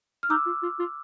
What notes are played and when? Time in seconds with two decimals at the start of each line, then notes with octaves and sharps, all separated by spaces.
0.23 F6
0.30 D#4 D6 E6
0.46 F4
0.63 F4
0.79 F4